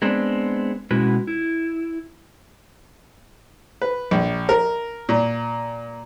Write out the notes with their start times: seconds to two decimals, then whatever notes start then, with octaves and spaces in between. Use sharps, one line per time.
0.02 G#3 B3 C4 D4
0.91 B2 G#3 C#4 E4 F#4 B4
1.27 E4
3.82 B4
4.11 A#1
4.49 A#4
5.09 A#2